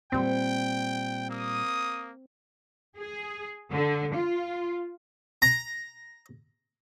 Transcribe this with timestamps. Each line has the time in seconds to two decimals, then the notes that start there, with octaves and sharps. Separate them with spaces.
0.12 A#2 G3 C4 G5
1.30 A#3 D#6
2.98 G#4
3.72 D3
4.15 F4
5.42 A#5